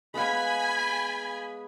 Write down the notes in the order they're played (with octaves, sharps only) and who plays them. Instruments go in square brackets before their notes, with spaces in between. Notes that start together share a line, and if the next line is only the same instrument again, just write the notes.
[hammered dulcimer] G#3 B3 F5 [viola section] G#5 B5